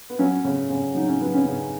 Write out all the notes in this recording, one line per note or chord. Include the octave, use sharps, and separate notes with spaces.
B3
F#3 C#4
C#3
C#3
F#3 D#4
C#4
F#3 B3
C#4
C#3